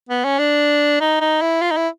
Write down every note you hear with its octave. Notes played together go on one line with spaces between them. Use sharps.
B3
C#4
D4
D#4
D#4
E4
F4
D#4
E4